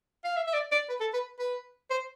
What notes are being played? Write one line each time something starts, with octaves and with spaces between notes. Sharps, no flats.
F5
E5
E5
D5
D5
B4
A4
B4
B4
C5